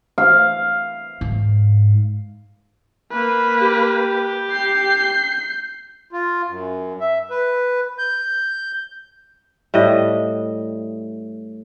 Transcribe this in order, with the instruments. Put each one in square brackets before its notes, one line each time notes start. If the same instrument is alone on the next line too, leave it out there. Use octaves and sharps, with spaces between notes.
[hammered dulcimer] F5
[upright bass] G#2
[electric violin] A#3 B4
[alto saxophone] G4
[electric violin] G6 C7
[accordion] F4
F#2
E5
B4
G6
[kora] A2 G3 D#5